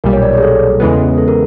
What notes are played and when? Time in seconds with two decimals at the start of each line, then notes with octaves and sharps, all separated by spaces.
0.04 B1 A#2 G3 A#4
0.13 C#5
0.23 D5
0.33 C#5
0.37 G#4
0.43 A4
0.80 E2 C#3 E3 G#3 B3
1.18 A4
1.28 A#4